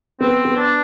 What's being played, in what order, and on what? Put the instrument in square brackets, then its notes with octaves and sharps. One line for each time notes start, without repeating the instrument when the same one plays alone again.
[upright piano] B3 [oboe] C4
[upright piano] B3
[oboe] D4